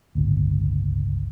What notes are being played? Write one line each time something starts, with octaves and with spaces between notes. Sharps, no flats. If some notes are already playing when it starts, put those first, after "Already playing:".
D1 G1 C#2